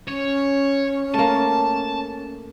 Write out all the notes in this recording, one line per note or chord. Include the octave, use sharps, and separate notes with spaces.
C#4 C#5
A3 A#3 A5